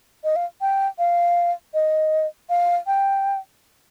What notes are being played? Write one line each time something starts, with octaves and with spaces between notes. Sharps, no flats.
D#5
F5
G5
F5
D#5
F5
G5